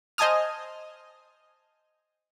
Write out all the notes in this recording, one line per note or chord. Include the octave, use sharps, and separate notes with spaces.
C5 D#5 G#5 A5 D#6 F6